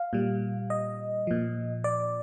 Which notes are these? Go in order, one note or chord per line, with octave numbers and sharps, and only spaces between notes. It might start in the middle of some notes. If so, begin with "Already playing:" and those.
Already playing: F5
A#2 G3
D#5
A#2 F3
D5